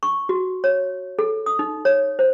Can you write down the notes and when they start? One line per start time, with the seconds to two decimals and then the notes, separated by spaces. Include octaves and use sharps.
0.03 C#6
0.29 F#4
0.64 C#5
1.19 A4
1.46 D#6
1.59 D#4
1.85 C#5
2.19 C5